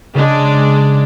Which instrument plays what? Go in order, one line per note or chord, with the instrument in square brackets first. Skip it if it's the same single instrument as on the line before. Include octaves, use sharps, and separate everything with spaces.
[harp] C#3 [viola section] G#3 D4